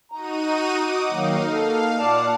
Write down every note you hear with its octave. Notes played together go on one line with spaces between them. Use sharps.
D#4 F#4 A#5 D#7
F#5 D6 D#6
D#3 F#3 A#3 D#4 F5
A#3 A4 F5
A#2 D5 F#5 A5